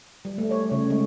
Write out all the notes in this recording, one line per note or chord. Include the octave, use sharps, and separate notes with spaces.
G3
A3
C#5
C#3
G#3